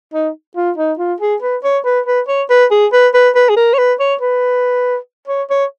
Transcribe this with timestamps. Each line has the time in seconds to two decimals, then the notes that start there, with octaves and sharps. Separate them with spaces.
0.14 D#4
0.56 F4
0.78 D#4
0.99 F4
1.20 G#4
1.42 B4
1.64 C#5
1.85 B4
2.06 B4
2.28 C#5
2.50 B4
2.71 G#4
2.93 B4
3.14 B4
3.35 B4
3.49 G#4
3.56 A#4
3.74 C#5
3.78 B4
4.00 C#5
4.21 B4
5.28 C#5
5.50 C#5